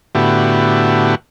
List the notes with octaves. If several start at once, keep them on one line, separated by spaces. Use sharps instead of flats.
A2 D3 B3 E4 F#4 G4